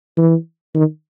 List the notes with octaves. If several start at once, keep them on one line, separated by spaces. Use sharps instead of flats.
E3
D#3